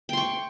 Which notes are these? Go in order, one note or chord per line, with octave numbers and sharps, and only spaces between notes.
G5 C6 C#6